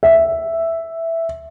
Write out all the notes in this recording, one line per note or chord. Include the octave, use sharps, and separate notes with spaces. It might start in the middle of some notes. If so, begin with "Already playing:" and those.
E5